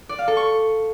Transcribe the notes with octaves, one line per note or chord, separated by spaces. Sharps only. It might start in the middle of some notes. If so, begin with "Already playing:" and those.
D5
F5
A4
C#6